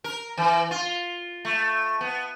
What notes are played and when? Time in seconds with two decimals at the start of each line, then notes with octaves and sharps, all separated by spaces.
0.04 A#4
0.38 E3
0.71 F4
1.45 A3
2.01 B3